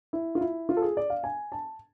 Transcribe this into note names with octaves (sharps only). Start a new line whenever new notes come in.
E4
F4
E4
F4
A4
G#4
D5
F5
G#5
A5